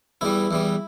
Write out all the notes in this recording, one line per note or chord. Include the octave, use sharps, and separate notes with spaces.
E2 E3 G3 E4
E2 E3 G3